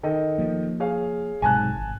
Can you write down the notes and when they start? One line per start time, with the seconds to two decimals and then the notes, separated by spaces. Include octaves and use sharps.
0.03 D#3 A4 D#5
0.38 F3 A#3
0.80 G#4 C#5 F5
1.42 B1 G#2 C3 G#5 A5 F#6
1.76 G#1